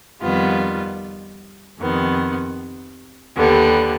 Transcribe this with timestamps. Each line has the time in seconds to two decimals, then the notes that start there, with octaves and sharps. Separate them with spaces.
0.22 F2 D#3 G3 B3 F4
1.79 F2 C3 D#3 B3
3.36 D#2 D3 G3 B3